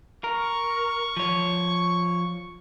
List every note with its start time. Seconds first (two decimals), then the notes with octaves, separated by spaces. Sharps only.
0.24 A#4 C#6
1.17 F3 C#5